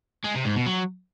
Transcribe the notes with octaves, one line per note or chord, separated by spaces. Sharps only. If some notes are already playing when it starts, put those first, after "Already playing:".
G#3
C3
G#2
B2
F#3